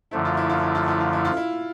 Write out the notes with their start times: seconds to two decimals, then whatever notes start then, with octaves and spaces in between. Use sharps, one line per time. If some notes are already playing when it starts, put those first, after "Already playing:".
0.11 F#2 D3 F3 A3 E4
0.25 F4
0.37 E4
0.49 F4
0.63 E4
0.75 F4
0.88 E4
1.00 F4
1.13 E4
1.25 F4
1.37 E4